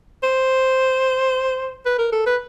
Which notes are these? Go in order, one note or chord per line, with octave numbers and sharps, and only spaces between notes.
C5
B4
A#4
A4
B4